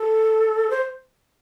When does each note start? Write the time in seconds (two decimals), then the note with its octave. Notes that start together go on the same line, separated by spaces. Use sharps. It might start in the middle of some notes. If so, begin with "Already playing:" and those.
Already playing: A4
0.70 C5